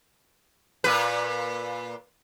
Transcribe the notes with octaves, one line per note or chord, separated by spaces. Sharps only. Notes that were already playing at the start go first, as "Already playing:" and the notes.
A#2 B4